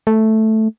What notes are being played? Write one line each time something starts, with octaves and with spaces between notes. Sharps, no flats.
A3